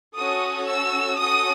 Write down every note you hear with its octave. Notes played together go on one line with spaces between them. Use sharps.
C#4 F#4 A4 D#6
E6
C#4 F#4 A4 D#6